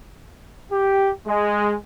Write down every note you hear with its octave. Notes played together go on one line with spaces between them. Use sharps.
G4
G#3